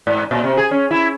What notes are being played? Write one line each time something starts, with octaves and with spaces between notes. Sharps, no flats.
G#2
A#2
C3
G#4
C#4
E4